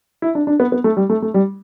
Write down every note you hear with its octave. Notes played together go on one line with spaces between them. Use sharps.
E4
D4
D4
B3
B3
A3
G3
A3
A3
G3